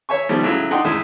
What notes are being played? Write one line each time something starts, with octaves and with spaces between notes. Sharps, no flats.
C#5 E5 G#5 C#6
B2 D#3 F3 G3
A2 C#3 F#3 E5
D4 D#4 F#5 G5 C6
A1 F#2 A2 G#3 G#4 E5